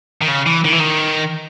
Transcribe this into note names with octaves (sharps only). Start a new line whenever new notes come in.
D#3
C#3
E3
D#3
E3
D#3